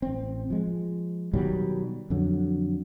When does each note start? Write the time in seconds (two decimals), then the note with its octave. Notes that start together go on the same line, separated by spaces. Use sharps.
0.02 A1 C4
0.50 F3 G#3
1.33 B2 D#3 F#3 G3
2.10 F2 D3 F#3